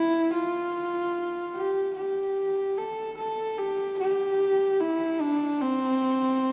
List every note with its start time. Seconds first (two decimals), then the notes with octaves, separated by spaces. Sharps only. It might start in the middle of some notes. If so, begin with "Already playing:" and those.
Already playing: E4
0.33 F4
1.56 G4
1.96 G4
2.78 A4
3.18 A4
3.58 G4
3.99 G4
4.81 E4
5.21 D4
5.61 C4